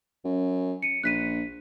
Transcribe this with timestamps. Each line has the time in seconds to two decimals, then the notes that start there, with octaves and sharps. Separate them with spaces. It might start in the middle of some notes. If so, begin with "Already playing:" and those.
0.25 F#2
0.82 C#7 D#7
1.04 A#1 F#6 B6 D#7